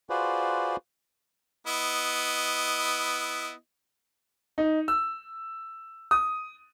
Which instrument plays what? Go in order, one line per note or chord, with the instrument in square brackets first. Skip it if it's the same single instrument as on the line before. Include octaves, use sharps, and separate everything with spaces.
[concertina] F4 F#4 G#4 B4 C5 D5
[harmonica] B3 E4 D#5
[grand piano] D#4
E6
D#6